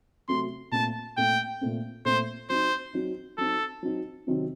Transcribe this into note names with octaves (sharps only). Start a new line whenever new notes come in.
C3 F#3 A3 C4 C6
A#2 A3 C4 A5
A#2 A3 C4 G5
A#2 A3 C4
A#2 A3 C4 C5
F#3 C4 D#4 C5
F#3 C4 D#4
F#3 C4 D#4 A4
F#3 C4 D#4
C3 D#3 F#3 C4 D#4